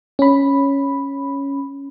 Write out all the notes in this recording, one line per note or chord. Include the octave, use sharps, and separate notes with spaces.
C#4 B5